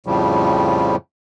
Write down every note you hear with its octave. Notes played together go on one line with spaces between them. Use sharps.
F2 A2 C#3 F3 G3